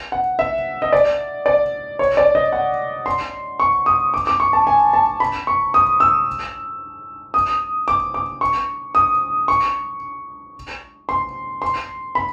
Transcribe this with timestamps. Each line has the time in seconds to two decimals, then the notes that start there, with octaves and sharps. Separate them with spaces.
0.12 F#5
0.39 E5
0.82 D#5
0.93 D5
1.46 D5
1.99 C#5
2.17 D5
2.35 D#5
2.52 F#5
3.06 C6
3.60 C#6
3.86 D#6
4.14 D6
4.27 D6
4.40 C#6
4.53 A5
4.67 G#5
4.93 A5
5.20 B5
5.47 C#6
5.74 D#6
6.00 E6
7.34 D#6
7.88 D6
8.14 D6
8.41 C#6
8.95 D#6
9.48 C#6
11.09 C6
11.62 C6
12.15 B5